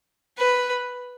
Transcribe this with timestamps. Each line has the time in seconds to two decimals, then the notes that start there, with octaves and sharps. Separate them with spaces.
0.37 B4